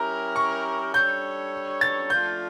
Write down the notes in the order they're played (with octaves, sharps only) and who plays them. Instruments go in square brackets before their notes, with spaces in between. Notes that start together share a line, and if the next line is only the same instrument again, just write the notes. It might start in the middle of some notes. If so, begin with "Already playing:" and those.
Already playing: [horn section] G3 C#4 E4 G4 A#4 [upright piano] A#5
[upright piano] C#6
[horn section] G3 D4 A4 C#5 [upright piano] G6
[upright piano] A6
[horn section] F3 A3 D4 F4 [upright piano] G6